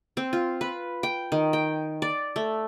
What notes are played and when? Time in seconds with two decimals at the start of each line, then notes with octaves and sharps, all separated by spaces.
0.17 C4
0.33 F4
0.61 B4
1.03 G5
1.32 D#3
1.53 G5
2.02 D5
2.36 A3